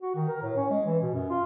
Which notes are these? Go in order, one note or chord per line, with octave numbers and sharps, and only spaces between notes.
F#4
D#3
A#4
A2
C#4
G#3
E3
B2
F#2
F4